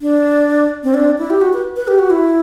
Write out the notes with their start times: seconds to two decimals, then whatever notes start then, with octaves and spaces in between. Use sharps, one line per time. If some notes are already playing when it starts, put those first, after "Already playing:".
0.01 D4
0.84 C4
0.94 D4
1.18 E4
1.30 G4
1.42 F#4
1.53 B4
1.76 B4
1.88 G4
1.99 F#4
2.10 E4